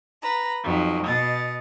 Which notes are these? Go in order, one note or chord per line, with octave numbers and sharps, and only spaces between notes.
B4 A#5
F2 F#3 D#4
B2 D#5 A6